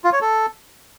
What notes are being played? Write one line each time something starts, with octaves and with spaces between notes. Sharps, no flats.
F4
C#5
A4